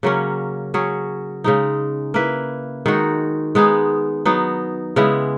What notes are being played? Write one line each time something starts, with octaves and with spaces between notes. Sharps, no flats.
C#3 F#3 A#3 C#4
F#3 C#4 G#4
C#3 G#3 D#4
A#3 E4 B4
D#3 G#3 D#4 F#4
G#3 B3 D#4 G#4
F#3 B3 D#4
C#3 G#3 B3 E4